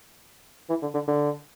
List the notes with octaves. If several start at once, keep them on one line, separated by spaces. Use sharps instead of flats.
E3
D3
D3
D3